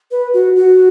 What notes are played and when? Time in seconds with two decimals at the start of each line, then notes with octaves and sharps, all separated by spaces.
0.11 B4
0.33 F#4
0.56 F#4